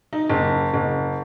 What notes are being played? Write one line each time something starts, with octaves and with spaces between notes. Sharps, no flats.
D#4
F#1
F#1